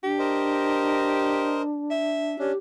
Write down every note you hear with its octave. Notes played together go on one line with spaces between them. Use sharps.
D4 G4
A#4 C5 D#5
E5
C#4 D4 G4